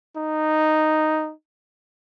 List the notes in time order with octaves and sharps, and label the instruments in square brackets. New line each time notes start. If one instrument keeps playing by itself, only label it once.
[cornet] D#4